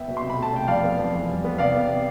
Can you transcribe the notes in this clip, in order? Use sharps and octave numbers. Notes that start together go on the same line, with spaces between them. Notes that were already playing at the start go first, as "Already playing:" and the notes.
Already playing: B3 E5 G5
B2
C6
C3
B5
A3 A5
C3 G5
F2 D5 F5
B3
F2
E2
G3
B3
C3 D5 F5
B3
C3